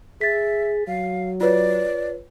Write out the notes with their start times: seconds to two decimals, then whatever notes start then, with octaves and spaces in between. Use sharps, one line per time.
0.21 G#4 E5 A6 B6
0.87 F#3 F5
1.41 F4 B4 C#5 D5